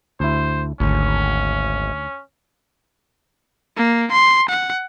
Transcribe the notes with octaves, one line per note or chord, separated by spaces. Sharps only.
D2 E4 C5
G#1 D2 C#4
A#3
C6
F#5